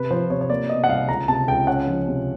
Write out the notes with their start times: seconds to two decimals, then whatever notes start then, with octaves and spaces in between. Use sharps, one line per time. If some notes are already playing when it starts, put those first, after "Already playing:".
Already playing: C3 B4
0.11 F3 C5
0.30 C3 C#5
0.41 C#5
0.50 A#3 D5
0.69 B2 D#5
0.84 F#5
0.89 C2 F5
1.09 C#2 A#5
1.28 C3 A5
1.48 C#2 G5
1.67 C#4 F#5
1.87 F3
2.07 C3